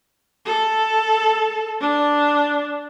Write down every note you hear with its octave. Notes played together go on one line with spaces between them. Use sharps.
A4
D4